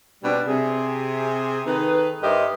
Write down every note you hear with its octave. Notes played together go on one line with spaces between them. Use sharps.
B2 G3 C4 D4
C3 G#4
D#3 D#4 G#4 A4 B4
G2 G4 A#4 C5 D#5 E5